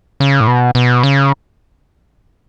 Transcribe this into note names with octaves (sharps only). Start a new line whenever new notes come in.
C#3
A2
B2
B2
C#3